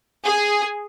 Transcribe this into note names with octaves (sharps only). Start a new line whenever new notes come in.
G#4